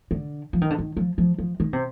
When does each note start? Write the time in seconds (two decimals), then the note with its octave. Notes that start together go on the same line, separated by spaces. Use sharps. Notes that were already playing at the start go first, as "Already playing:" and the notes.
0.11 D3
0.53 F3
0.61 D#3
0.70 D3
0.79 D#3
0.97 F3
1.18 F3
1.38 F3
1.60 D#3
1.73 C3